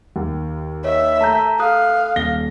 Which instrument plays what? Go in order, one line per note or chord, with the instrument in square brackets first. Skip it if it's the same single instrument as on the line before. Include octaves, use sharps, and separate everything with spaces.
[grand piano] D#2
[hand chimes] C#5 D#5 [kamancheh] E5
[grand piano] A3 [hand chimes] A5 A#5 G6
[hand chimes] A4 D#6 F#6 [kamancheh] F5
[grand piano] D#1 A#6 G7